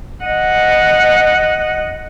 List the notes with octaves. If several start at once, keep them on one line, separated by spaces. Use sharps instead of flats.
D#5 F#5